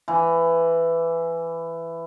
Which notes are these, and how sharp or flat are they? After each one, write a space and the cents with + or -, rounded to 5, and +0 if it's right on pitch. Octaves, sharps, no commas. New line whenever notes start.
E3 +15